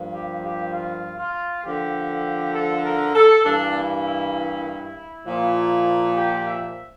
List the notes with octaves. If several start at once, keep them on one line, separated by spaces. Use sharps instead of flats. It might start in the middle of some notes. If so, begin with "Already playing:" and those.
Already playing: G2 F3 A#3
G4
G4
F4
F4
D3 F3 A#3 G4
A4
A#4
A4
G2 E3 A#3 D4
E4
E4
E4
A#2 F3 A#3
G4
E5